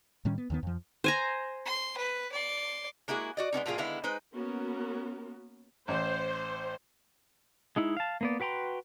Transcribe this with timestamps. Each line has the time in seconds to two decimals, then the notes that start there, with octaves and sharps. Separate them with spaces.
0.25 A2 D#3 G3 C#4
0.38 B3
0.50 D#2 D#3 B3
0.63 F2 F3
1.04 C5 G#5 A#5
1.65 C6
1.97 B4
2.32 D5 C6
3.08 G#3 A#3 E4 F#4 G#4
3.37 F#4 D5 D#5
3.53 G#3 B3 C#4 D#4
3.66 A2 F3 A#3 F4 G#4
3.78 D3 D#3 G#3 B3 E4 F5
4.04 G#3 D#4 B4 C5
4.33 A#3 B3 C#4 F#4 A#4
5.88 A1 C5
7.76 G#3 D#4 E4
7.97 F5 A5
8.21 A#3 B3 D5
8.40 F#4 B4 G5 A#5 C6